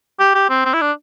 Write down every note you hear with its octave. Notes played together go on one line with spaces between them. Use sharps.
G4
G4
C4
C4
E4
D4